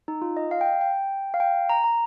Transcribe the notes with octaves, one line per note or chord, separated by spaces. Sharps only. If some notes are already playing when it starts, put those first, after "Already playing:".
D#4
F4
D#5
F5
G5
G5
F5
G5
A#5
A#5